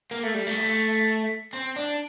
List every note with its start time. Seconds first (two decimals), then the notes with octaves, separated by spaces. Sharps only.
0.11 A#3
0.23 A3
0.34 G3
0.47 A3
1.53 C4
1.76 D4